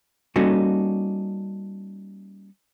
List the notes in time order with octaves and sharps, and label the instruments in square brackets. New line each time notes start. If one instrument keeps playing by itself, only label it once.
[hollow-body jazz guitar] G3 A#3 C#4 D#4 F#4 A4